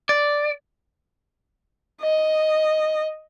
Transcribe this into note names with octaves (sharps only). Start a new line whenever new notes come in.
D5
D#5